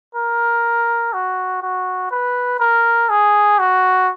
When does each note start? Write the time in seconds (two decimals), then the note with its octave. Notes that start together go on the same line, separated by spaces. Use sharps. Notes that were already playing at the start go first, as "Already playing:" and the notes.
0.15 A#4
1.13 F#4
1.62 F#4
2.11 B4
2.60 A#4
3.10 G#4
3.59 F#4